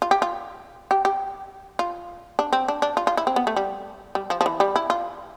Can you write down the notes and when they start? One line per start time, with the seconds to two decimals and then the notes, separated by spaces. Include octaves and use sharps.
0.02 F4
0.11 G4
0.22 F4
0.91 G4
1.05 G4
1.79 F4
2.39 D4
2.53 C4
2.68 D4
2.82 D4
2.97 F4
3.07 F4
3.17 E4
3.27 C4
3.36 B3
3.47 A3
3.56 G3
4.15 G3
4.30 F3
4.41 F3
4.46 E3
4.60 G3
4.76 E4
4.90 F4